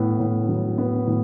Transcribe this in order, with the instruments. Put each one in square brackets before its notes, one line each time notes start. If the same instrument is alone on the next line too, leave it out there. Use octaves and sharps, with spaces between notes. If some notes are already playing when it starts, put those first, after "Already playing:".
Already playing: [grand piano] A2 B3
A2
F#3
B3
A2